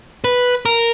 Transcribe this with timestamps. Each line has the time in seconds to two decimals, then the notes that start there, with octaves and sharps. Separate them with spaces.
0.24 B4
0.65 A#4